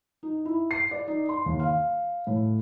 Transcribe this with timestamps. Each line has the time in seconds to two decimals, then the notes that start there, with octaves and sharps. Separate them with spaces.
0.23 D#4
0.45 E4
0.71 C7
0.91 D5
1.08 D#4
1.29 C6
1.46 D#2
1.60 F5
2.27 A2